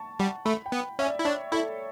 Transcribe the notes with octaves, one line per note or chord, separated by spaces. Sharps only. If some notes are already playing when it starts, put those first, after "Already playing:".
Already playing: A5 C#6
G3 F#5
A3 B5
G5
B3
C#4 E5
D5
E4
D4 C#5
E4 A4